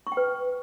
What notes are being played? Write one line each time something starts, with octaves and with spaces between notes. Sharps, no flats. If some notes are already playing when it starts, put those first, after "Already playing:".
C#6
G5
B4